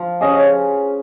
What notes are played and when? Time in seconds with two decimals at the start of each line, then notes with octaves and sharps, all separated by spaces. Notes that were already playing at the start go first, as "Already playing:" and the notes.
Already playing: F3
0.21 C#4 G#4 D#5
0.37 C#5